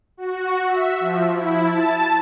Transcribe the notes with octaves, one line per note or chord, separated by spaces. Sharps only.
F#4
E5
F3
E4
A5